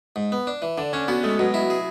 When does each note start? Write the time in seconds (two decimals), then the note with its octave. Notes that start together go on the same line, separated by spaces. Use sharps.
0.16 G#2
0.32 B3
0.47 D4
0.62 E3
0.78 D3 D4
0.93 C#4 D4
1.08 B3 F#4
1.23 G#3 A3
1.39 B2 F#3
1.54 E4
1.70 G#4